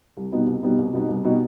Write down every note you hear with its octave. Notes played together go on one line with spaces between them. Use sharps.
C2
B2 G3 B3 D#4
C2
B2 G3 B3 D#4
C2
B2 G3 B3 D#4
C2
B2 G3 B3 D#4